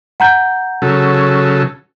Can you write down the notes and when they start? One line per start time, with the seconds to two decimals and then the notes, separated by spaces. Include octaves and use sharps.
0.20 F#5 A#5 G6
0.82 C#3 F#3 A4